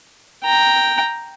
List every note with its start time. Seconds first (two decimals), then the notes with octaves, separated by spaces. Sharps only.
0.44 G5 A#5